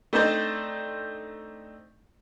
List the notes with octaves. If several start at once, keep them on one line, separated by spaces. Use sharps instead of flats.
A3 C4 D4 D#4 C5 D5